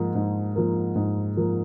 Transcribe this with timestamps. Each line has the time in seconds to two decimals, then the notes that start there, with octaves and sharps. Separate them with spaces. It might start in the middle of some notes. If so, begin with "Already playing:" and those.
Already playing: G#2 F3 A#3
0.15 G#2
0.55 F3 A#3
0.96 G#2
1.37 F3 A#3